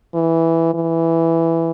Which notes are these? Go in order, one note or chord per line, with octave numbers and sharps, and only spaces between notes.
E3
E3